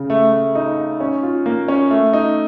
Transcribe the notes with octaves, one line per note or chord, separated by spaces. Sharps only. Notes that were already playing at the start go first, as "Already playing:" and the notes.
Already playing: C#3
A3
A3
D#4
D#4
C#4
F4
A#3
C#4
A3
D#4